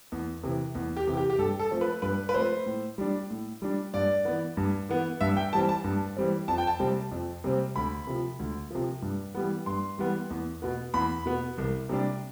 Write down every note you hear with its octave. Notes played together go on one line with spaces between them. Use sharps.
E2
C3 E3
E2
G4
C3 E3
G4
G4
G2 A4
A4
F3 A3 C4
B4
G2 B4
B4
F3 A3 C4 C5
A2
G3 D4
A2
G3 D4
G2 D5
E3 B3
G2
E3 B3
G2 E5
G5
E3 G3 C4 A5
A5
G2
E3 G3 C4
F2 A5
G5
A5
C3 G3 C4
F2
C3 G3 C4
D2 B5
C3 F3
D2
C3 F3
G2
E3 G3 B3
G2 C6
E3 G3 B3
E2
B2 B3
E2 B5
B2 B3
C2
C3 G3 D4